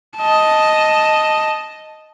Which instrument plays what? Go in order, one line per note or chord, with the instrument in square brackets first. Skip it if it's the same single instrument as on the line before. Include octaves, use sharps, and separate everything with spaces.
[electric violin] D#5 A5